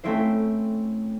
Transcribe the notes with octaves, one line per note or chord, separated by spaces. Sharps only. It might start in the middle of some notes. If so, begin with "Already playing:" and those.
A3 C4 C#4 E4 C5